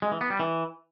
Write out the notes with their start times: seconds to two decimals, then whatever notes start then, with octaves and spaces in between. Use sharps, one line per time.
0.02 G#3
0.12 E3
0.21 B3
0.30 G3
0.40 E3